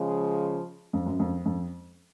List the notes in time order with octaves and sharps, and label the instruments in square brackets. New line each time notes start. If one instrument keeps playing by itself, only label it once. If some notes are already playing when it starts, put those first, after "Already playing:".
Already playing: [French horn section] C#3 F3 G#3
[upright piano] F2
F#2
F2
F2